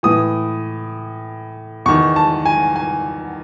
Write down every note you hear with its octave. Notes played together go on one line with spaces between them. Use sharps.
A2 E3 D#6
E2 D#3 C#6
A5
G#5
G#5